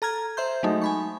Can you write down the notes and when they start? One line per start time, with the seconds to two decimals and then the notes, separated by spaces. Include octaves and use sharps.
0.02 A4 A#5 F6 G#6
0.37 C5 E5 C6 G6
0.63 F#3 G#3 A3 D#4
0.82 G#5 B5 C#6